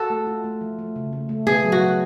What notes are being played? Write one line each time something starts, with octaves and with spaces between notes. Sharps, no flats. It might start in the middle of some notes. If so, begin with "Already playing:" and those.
Already playing: F#4 A4
A3
F4
A3
F3
A3
C#3
A3
A3
B3 G#4
F#3
F#4
F#3